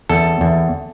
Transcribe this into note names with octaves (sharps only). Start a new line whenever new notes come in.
E2 A4
E2